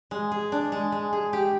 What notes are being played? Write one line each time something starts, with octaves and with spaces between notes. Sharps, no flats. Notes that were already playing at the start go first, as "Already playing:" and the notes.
G#3
G#4
D4
G#3
G#3
G#4
G4